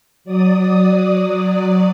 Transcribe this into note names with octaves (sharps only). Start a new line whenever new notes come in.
F#3 D5 D#6